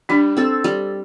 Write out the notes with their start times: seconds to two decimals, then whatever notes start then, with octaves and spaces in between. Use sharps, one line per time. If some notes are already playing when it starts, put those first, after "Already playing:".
0.09 G3 D4
0.37 C4 A4
0.64 G3